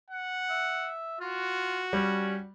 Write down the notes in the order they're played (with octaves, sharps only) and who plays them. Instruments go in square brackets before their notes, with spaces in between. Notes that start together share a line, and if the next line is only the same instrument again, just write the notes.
[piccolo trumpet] F#5
[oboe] E5
[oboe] F4 [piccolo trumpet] F#4
[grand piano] G3 [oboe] C#4